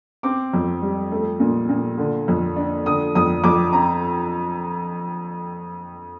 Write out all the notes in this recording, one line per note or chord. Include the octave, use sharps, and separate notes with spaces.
C4 D6
F2
G3
A3
A#2
A#2
D3
F2
D4
D3 D#6
F2 D#6
F2 D6
C4 A#5